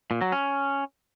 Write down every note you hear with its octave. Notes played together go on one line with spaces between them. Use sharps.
A#2
F#3
C#4